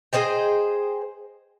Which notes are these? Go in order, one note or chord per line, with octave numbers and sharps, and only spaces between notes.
G#4 C5 D#5 G5